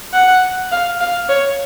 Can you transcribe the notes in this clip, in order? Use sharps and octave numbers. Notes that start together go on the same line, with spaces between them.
F#5
F5
F5
C#5